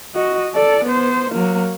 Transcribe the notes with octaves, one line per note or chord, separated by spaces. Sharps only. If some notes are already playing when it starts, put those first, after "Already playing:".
F#4 D#5
A4 D5
B3 C5
F#3 A#3